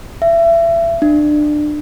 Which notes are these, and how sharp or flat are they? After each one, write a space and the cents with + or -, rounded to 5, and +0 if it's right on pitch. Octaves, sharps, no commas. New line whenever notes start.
E5 +30
D4 +25